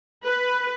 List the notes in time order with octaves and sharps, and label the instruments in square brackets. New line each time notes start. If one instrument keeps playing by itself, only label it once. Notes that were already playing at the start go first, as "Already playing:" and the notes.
[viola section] B4